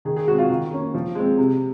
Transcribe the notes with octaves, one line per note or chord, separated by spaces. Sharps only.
D#3 G#4
G#4
G#3 C4 F#4
F4
D#3
A#3 C#4
F3
G#3 C4
C3